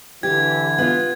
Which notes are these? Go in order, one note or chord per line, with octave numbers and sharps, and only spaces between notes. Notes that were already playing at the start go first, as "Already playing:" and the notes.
D3 E3 G4 G#6
B3 F4